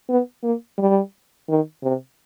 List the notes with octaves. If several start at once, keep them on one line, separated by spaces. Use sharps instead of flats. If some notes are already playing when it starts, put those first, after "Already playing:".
B3
A#3
G3
D#3
C3